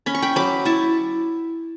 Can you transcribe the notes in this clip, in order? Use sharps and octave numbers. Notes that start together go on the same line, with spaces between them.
C#4 B5
C#6
G5 B5
F#3 B5 D6
E4 A5 C#6